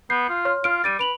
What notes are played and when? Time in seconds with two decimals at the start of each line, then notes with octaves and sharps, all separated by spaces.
0.10 B3 G6 C7
0.29 F4
0.45 C#5 C6 F6
0.64 F4 F6 D7
0.84 G3 A6 D7 D#7
0.99 B4 D7 F7 F#7